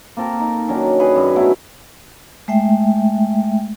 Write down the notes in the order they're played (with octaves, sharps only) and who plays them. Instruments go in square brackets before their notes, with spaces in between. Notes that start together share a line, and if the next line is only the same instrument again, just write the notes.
[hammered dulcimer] A#3 C4 A4 A#4
D#4
D#3 F#3 C#4 D4
G#4 B4 F#5
F#2
F#3 A3 B3 E4
[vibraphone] G#3 A3 E5 G5